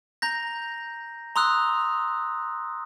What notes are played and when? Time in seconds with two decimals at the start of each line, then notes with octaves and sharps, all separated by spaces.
0.22 A#5 G6 A#6
1.36 A#5 C6 D#6 E6 F#6